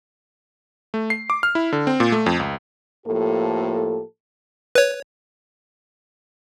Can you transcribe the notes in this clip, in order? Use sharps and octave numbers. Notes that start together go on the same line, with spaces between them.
A3
C7
D6
F6
E4
D3
C4
A#2
A3
F2
C#2
A2 F3 A#3 G4 A4
B4 C#5